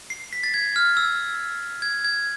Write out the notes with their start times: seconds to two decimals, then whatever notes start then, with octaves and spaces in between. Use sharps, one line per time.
0.10 C7
0.33 B6
0.43 A6
0.54 G#6
0.76 F6
0.97 E6
1.82 G#6
2.04 G#6